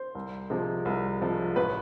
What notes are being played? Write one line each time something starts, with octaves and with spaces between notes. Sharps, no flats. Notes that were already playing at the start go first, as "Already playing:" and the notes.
Already playing: C5
C2
C3 F3 G#3
C2
C3 F3 G#3
A1 B4